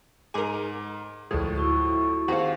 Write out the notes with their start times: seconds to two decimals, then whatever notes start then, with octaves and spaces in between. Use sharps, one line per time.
0.34 G#2 G#4 A#4 D6 D#7
1.31 D2 A2 F3 G#3 A3
1.56 E4 F#4 C#6
2.28 D#2 C4 F#4 G#4 C5 F5